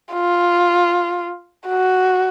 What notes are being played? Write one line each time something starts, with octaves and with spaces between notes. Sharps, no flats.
F4
F#4